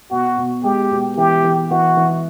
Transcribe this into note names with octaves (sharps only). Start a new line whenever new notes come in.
B2 F#4
B2
G#3 G4
B2
E3 G4
E3
E3 F#4
E3